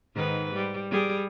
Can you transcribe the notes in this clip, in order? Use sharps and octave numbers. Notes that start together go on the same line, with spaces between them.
G#2 D#3 B4
G3
G3 G#4